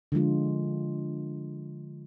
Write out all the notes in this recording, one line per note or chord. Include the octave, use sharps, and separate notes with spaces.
D3 F3 G#3 F4